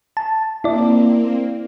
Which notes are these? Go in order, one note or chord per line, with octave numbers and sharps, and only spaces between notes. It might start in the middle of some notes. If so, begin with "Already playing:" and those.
A5
A#3 C4 E4 D5